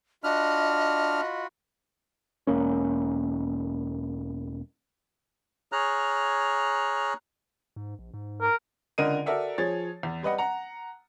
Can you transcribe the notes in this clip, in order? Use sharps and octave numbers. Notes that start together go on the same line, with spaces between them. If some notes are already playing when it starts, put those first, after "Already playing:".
D4 F4 F#4 D#5 B5 F6
E1 A#3 C#4
G#4 C#5 A#5 F6 F#6
G#2
A#1
G#2
A#4
C#2 D3 A#4 D#5 D#7
F#4 A4 A#4 D5 E5 F#5
F3 G#4 C#5 A6
E2
G3 B4 D#5 F#5
F#5 A#5